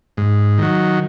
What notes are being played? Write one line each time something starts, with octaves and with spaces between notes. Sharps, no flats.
G#2
D#3 F#3